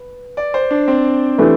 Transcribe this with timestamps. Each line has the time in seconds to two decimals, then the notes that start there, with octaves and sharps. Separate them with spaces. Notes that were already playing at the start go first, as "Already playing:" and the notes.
Already playing: B4
0.37 D5
0.54 C5
0.71 D4
0.88 C4
1.38 E3 A3 D4 G4 B4